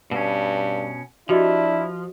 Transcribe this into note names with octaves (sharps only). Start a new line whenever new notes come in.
G2 B2 C#4
F3 D4 E4 F#4 G4 D#5